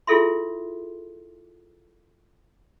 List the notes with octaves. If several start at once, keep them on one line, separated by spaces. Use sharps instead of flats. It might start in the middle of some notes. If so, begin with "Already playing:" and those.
E4 F4 G#4 A4 E5 C6